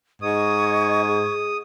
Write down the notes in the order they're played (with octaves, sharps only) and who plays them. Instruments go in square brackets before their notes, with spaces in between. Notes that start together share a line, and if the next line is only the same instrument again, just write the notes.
[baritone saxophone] G#2 [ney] D#5 [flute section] C#6 G#6 [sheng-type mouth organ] D#6
[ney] G#4